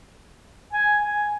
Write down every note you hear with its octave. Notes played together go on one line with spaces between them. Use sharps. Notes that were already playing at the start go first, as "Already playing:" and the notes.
G#5
G#5